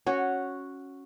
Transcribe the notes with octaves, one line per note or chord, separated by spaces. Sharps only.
C#4 F#4 C#5